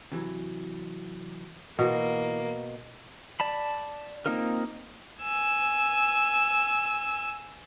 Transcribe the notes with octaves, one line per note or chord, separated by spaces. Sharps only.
C3 E3 F#3
B2 E3 A#3 F4 F#4
D5 A5 B5
A#3 C4 D#4 F4 A#4
G#5 E6